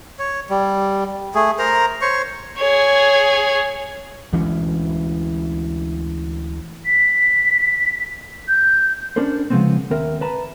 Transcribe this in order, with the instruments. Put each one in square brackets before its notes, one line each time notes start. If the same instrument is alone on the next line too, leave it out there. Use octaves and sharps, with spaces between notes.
[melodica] C#5
G3
A3 G#4
A#4 C5 A#5
C5 C#5 C#6
[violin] G#4 C#5
[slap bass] D2 E3 G#3 C#4
[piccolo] B6
G6
[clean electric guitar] C#4 D4 A4 A#4 C5
C#3 F3 F#3 G#3 B3 C4
D#2 C4 A#4 E5
B4 A5 A#5